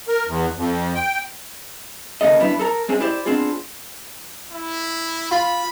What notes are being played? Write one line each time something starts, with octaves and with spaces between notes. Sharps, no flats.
A#4
E2
F2
G5
D#2 C#3 A#3 A4 D#5
F#2 G3 B3 D4 E4
A4 A#4 A#5
G#3 C4 C#4 G#4
E4 G4 C5 D5
B3 C4 D4 F4 G#4
E4
F4 B5